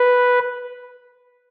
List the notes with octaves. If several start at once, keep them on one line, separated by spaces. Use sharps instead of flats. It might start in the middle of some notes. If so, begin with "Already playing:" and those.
Already playing: B4